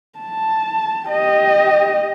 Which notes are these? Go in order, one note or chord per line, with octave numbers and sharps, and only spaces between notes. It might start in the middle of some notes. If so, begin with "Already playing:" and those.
A5
G4 D#5